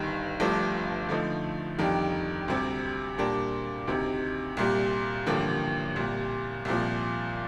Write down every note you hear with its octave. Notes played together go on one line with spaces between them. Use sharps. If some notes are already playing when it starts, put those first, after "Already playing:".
Already playing: G1 G2 D#3
G1 G2 F3 A3 D4
D3 F3 A3 D#4
F1 F2 D#3 G3 D4
D2 C3 G3 C4
A#2 G3 D4 G4 A#4
D2 C3 D#3
C2 A#2 G3
A1 G2 D3 F3 A#3
C2 A#2 G3
C2 A#2 F3